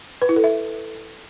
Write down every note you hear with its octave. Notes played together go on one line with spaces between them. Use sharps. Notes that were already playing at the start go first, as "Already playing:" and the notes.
B4
E4
A4
E5